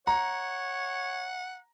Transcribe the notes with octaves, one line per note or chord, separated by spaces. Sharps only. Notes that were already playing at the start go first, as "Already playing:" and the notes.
C#5 F#5 A#5